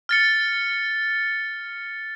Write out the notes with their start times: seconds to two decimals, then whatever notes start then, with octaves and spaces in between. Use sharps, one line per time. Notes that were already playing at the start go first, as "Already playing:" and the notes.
0.09 F6 A6 C#7